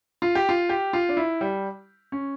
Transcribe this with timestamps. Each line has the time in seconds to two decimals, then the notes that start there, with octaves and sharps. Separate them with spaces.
0.22 F4
0.35 G4
0.49 F4
0.69 G4
0.93 F4
1.09 D4
1.17 E4
1.41 G3
2.12 C#4